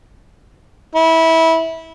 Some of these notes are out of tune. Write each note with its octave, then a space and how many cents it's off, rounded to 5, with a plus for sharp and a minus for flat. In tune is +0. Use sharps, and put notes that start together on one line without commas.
E4 -20